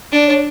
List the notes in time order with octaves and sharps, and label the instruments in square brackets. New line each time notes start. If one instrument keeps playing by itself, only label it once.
[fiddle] D4 [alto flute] D5
[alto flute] C#5